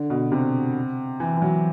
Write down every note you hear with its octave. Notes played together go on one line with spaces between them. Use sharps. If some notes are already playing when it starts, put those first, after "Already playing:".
Already playing: D3
B2
C3
E3
E3
F#3